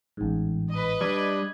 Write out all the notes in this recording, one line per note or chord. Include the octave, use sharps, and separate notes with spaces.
A1 G#2
B4 D#5
G3 D4 G#6